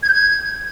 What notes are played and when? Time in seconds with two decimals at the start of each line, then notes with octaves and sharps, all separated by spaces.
0.02 G#6
0.07 G6
0.13 G#6